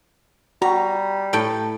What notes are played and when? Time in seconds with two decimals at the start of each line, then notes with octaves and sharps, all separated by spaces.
0.62 G3 F#4 A#5
1.33 A2 A4 G5